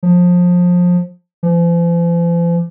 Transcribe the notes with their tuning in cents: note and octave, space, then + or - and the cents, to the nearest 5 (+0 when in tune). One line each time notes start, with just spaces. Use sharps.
F3 +25
F3 -45